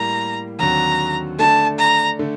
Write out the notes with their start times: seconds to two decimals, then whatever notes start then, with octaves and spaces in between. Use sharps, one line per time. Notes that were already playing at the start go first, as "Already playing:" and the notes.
Already playing: A2 G3 A#3 A#5
0.59 D#2 D3 F#3 C4 F#4 A#5
1.39 D3 A3 D4 A5
1.79 A#5
2.19 D3 A3